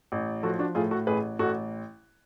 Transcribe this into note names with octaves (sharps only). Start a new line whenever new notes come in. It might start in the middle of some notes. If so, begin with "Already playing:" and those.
A1
F3 F#4 A4
D4 F#4
A2 F4 G#4
F#4 A4
A1 G#4 B4
A1 F#4 A4